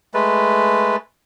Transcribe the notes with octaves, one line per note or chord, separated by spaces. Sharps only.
G#3 A3 B4